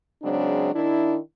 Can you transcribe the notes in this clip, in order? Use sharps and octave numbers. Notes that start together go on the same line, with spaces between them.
C#3 F#3 G#3 C4 D4
D#3 D4 E4